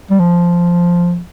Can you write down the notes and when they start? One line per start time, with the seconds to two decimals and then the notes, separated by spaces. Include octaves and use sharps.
0.11 G3
0.20 F3